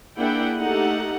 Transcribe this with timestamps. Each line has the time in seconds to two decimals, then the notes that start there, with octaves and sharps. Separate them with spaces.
0.18 A#3 D4 E4 G#4 F#5 G5
0.59 A3 D#4 G4 F#5